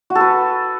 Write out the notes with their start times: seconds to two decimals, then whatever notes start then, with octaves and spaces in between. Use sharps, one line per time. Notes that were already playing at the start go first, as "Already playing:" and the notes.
0.10 F#4
0.15 A4
0.21 B4